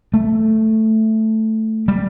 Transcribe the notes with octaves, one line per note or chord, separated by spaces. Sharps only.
A3
G3